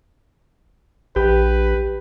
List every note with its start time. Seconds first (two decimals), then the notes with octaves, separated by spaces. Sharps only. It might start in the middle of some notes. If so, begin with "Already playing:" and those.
1.16 A#1 G4 B4